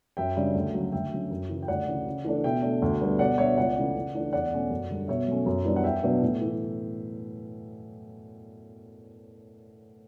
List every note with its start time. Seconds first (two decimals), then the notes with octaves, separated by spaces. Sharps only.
0.17 F#2 E5 G5
0.37 C#3 G3 D4
0.54 D2
0.74 C#3 F#3 A3
0.92 D2 E5 G5
1.12 D3 F#3 C#4
1.30 F#2
1.49 C#3 E3
1.63 G5
1.68 D2 D5 F#5
1.88 C#3 E3
2.07 C#3
2.25 E3 A3 D4
2.44 B2 E5 G5
2.62 A3 D4
2.82 D2
3.01 D3 G3 B3 D4
3.19 B2 D5 F#5
3.38 G3 B3 D4 C#5 E5
3.58 C#2 D5 F#5
3.76 C#3 E3 A3 C#4
3.95 C#3
4.15 E3 A3 D4
4.33 E2 D5 F#5
4.52 B2 A3 C#4
4.70 F#2
4.90 D3 G3 D4
5.08 B2 C#5 E5
5.27 F#3 A3 C#4
5.46 F#2
5.65 E3 G3 B3 D4
5.76 F#5
5.84 E2 E5 G5
6.03 B2 F#3 B3 D4
6.22 A2
6.41 E3